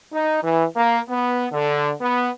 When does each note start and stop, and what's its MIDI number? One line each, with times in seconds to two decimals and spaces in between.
0.13 0.40 63
0.42 0.65 52
0.76 0.99 58
1.09 1.46 59
1.52 1.92 50
2.01 2.28 59